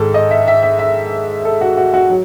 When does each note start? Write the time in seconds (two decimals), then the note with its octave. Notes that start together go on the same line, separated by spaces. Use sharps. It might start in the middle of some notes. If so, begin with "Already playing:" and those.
Already playing: G#2 D#3 A4
0.14 D#5
0.31 E5
0.48 E5
0.63 E5
0.79 E5
1.45 A4
1.61 F#4
1.77 F#4
1.94 F#4
2.09 F#3